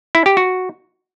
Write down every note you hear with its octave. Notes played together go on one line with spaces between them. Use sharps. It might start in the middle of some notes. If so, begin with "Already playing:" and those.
E4
G4
F#4